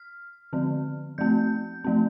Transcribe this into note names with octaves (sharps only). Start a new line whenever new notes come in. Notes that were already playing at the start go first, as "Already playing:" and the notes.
Already playing: F6
D3 F3 C4
F3 A3 C4 G6
F3 A3 C4